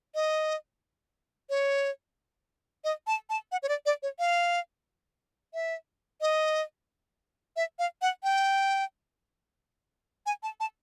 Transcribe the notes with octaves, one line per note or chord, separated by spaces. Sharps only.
D#5
C#5
D#5
A5
A5
F#5
C#5
D5
D5
C#5
F5
E5
D#5
E5
F5
F#5
G5
G#5
A5
A5